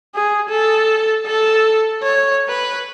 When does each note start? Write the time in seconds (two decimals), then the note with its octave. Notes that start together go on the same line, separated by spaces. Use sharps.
0.15 G#4
0.49 A4
1.27 A4
2.03 C#5
2.49 B4